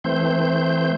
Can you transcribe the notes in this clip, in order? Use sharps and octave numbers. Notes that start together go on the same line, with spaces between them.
E3 A3 C4 C5 G6